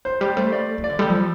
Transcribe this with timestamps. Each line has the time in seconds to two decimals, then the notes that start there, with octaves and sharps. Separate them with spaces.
0.05 F3 C5
0.21 G3 G4
0.37 A3 C5
0.52 D5
0.78 F3
0.84 D5
0.90 D3
0.99 G3 A4
1.10 F3